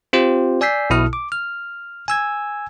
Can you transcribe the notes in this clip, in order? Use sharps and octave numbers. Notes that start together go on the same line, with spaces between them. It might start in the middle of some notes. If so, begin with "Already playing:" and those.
C4 F4 G4 C5
D5 G#5 E6 G6 B6 C7
B1 B2 E4 D#6 F6
D6
F6
G#5 E6 G#6